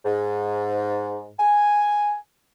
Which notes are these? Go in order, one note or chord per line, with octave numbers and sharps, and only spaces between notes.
G#2
G#5